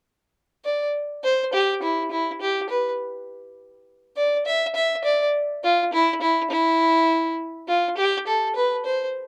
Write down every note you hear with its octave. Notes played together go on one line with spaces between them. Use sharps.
D5
C5
G4
E4
E4
G4
B4
D5
E5
E5
D5
F4
E4
E4
E4
F4
G4
A4
B4
C5